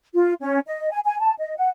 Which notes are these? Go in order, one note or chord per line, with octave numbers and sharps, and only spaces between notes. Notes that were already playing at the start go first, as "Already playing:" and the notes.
F4
C#4
D#5
G#5
G#5
A5
D#5
F#5